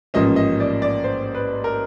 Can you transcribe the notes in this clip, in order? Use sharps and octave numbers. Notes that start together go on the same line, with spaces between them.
A1 G#2 F3 A#3 C#4 D#5
D#5
D5
D5
C5
B4
A#4